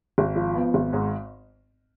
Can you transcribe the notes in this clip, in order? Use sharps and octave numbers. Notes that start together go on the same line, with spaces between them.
G#1
F3
B3
G#1
G#2